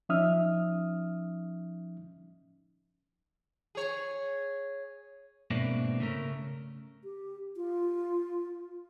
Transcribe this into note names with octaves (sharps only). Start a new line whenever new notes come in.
F3 C#4 D#4 E5 D#6 F6
G#4 C#5
G#2 B2 A#3 C4 D4 E4
C#3 A3 A#4
G4
F4